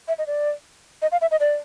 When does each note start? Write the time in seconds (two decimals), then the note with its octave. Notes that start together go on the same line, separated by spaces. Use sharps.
0.08 E5
0.18 D#5
0.27 D5
1.02 D#5
1.12 F5
1.21 E5
1.31 D#5
1.40 D5